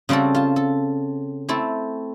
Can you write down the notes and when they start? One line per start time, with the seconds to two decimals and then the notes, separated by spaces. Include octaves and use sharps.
0.09 C#3 G3 C4 F#4 A4
0.35 F4 A5
0.56 A4
1.49 A3 C4 E4 A4